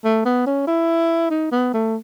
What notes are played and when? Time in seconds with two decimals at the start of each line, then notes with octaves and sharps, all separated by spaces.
0.05 A3
0.25 B3
0.46 C#4
0.67 E4
1.31 D#4
1.52 B3
1.74 A3